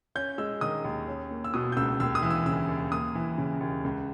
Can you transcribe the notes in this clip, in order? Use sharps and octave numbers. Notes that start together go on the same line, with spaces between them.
C#4 G6
G#3 E6
D#3 D#6
D#2
C#4
A#3
E6
B2 D#6
G6
C#2 E6
D#2 E6
D#6
E3
E6
C#3 E6
D#2
A#3 D#6
E3
C#3
D#2
C#2